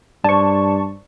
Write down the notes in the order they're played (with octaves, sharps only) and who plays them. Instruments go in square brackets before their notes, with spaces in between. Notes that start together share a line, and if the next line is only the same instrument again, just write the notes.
[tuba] G2 [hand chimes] C5 D5 [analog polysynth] A5 C#6